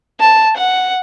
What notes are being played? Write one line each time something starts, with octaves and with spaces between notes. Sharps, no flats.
A5
F#5